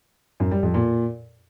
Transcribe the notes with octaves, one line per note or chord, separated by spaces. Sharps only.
F#2
G3
F2
A#2